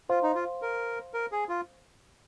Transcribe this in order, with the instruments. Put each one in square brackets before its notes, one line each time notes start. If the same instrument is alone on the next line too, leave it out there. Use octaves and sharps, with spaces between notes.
[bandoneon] F4 [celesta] C5 F5 C6
[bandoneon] D#4
F4
A#4
A#4
G#4
F4